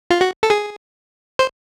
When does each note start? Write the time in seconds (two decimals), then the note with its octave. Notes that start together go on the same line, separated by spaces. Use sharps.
0.10 F4
0.21 F#4
0.43 A4
0.50 G#4
1.39 C5